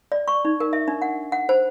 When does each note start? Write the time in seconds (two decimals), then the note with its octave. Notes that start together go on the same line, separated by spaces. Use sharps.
0.12 D5
0.28 C#6
0.45 D#4
0.60 A#4
0.73 E5
0.88 D4
1.02 F#5
1.32 F#5
1.49 C5